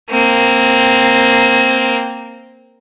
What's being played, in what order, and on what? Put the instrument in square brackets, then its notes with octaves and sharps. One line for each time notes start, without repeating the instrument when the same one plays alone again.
[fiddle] A#3 C4